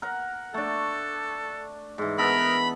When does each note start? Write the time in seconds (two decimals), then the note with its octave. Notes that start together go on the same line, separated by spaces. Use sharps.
0.02 A#4 F#5
0.54 A3 D4 A4
1.98 G#2 E3
2.18 B3 A4 A#4 B5